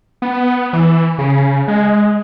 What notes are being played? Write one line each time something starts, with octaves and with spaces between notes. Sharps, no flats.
B3
E3
C#3
G#3